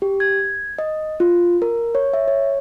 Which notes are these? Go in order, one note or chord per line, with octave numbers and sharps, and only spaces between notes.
G4
G#6
D#5
F4
A#4
C#5
E5
C#5